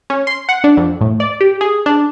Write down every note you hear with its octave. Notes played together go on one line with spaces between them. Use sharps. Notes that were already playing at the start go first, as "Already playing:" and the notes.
C#4
C6
F#5
D4
F2
A2
D5
G4
G#4
D4